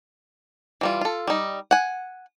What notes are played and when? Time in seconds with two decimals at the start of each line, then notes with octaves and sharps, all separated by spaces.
0.81 E3 G3 F4
1.01 F4 A4
1.27 G3 D#4
1.71 F#5 G#5